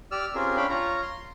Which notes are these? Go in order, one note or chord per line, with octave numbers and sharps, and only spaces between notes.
G4 D5 E6 F6
C4 C#4 F4 G4 G#4 A#4
C#4 D4 F5 G5 B5
F4 C#5 A#5
C6